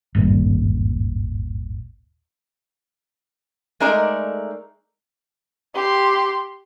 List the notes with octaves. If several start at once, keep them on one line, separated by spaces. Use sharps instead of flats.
D#1 G#1 G2 A#2
G#3 A3 D#4 A#4 D5
G4 C6